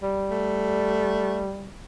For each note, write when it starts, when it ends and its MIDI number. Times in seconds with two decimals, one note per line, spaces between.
0.03 1.72 55
0.31 1.46 57